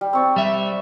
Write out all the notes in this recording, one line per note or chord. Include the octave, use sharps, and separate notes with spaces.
G3
C4 C#5 D5
G3 E5